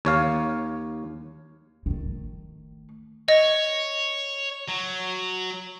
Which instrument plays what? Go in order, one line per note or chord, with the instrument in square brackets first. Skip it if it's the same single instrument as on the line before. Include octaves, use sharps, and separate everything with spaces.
[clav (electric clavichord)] D#2 C#5 F5
[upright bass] D#3 A3
[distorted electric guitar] C#5 [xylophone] D#5
[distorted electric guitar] F#3